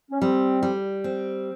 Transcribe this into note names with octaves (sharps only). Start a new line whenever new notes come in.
C#4
G3 C4
G3
C4